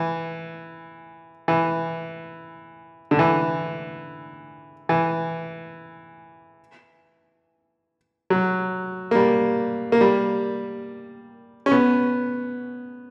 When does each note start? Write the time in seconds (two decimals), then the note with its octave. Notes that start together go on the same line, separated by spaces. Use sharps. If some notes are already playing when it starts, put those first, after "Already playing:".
Already playing: E3
1.48 E3
3.11 D3
3.19 E3
4.89 E3
8.30 F#3
9.11 A#3
9.15 G3
9.92 A#3
10.01 G3
11.66 C#4
11.71 B3